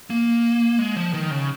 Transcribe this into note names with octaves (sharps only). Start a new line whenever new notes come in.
A#3
G#3
F3
D#3
C#3